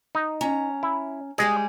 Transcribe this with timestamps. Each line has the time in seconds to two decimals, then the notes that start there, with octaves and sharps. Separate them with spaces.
0.15 D#4
0.41 C#4 A#5
0.83 E4
1.38 G3 G#3 G4 G#4 D#5